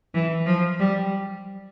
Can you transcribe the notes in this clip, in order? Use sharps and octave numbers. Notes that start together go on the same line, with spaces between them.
E3
F3
G3